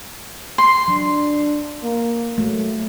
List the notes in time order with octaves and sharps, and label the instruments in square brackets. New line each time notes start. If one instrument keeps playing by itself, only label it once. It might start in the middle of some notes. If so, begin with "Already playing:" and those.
[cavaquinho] C6
[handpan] F#3 [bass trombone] D4
[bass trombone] A#3
[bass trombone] F#3 [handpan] A3